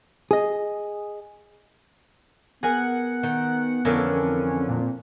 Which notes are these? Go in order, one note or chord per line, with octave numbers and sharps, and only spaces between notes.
G#4 D#5
B3 G#4 A#4 F#5 G#5
D#3
F2 D3 E3 C#4 A4 A#4
C4
A#2